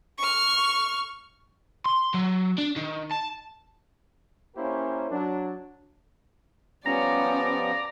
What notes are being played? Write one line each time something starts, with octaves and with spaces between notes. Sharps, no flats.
C#6 F6
C6
F#3
D4
D#3
A5
A#3 C#4 E4 G4 A#4 C5
F#3 D4
F3 G3 B3 C#4 D5 A#5